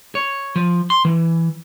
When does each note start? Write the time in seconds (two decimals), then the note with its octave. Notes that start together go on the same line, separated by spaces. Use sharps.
0.15 C#5
0.56 F3
0.90 C6
1.05 E3